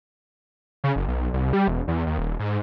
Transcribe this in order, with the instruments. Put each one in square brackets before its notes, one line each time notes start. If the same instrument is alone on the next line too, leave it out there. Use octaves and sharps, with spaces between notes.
[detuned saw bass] C#3
F#1
B1
C2
G3
E1
E2
D#2
D#1
G#2